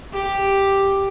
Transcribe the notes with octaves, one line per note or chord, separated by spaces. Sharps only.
G4